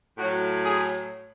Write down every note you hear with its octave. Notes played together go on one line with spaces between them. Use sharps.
A2 F#3 F#4
G#4